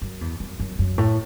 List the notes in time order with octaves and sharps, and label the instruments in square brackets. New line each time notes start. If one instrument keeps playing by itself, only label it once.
[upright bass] F#2
E2
F#2
F#2
F#2
A2